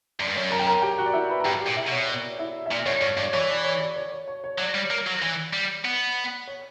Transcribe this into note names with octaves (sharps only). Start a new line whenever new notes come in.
F#2 D5
G2
F#2 C#5
A#4 A#5
G5
A#4 A#5
G4 G5
F#4 F#5
D5
E4 E5
B4 B5
A#5
G2 G4 G5
G4 G5
A#2
E4 E5
B2 C#5
C#5
D5
D5
E4 E5
E5
A#2 D5
F#2 C#5
G2 C#5
G2 D5
E3 C#5
D5
C#5
D5
C#5
C#5
C#5
C#5
F#3 D5
G3
A#3
F#3
E3
G3
B3
C#5